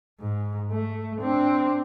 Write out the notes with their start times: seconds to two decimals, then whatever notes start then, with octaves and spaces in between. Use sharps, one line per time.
0.21 G#2
0.71 A3
1.22 C4 D4